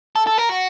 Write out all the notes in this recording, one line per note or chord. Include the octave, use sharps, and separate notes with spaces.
A4
A4
A#4
F#4